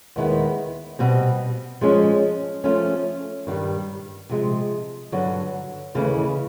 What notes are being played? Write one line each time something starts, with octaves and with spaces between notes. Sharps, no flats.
D#2 D#3 G#3 B3 E4
B2 G3 C4
F3 G#3 C#4
F3 A3 C#4
G2 D#3 G3
C3 F3 G#3
G2 D3 F#3
D#2 C#3 E3 A3